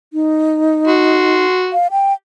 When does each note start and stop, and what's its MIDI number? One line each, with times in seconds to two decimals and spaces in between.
0.13 1.44 63
0.87 1.70 66
0.87 1.70 84
1.73 1.87 77
1.91 2.13 79